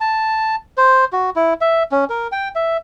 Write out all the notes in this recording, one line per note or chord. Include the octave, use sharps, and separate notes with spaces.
A5
C5
F#4
E4
E5
C#4
A#4
G5
E5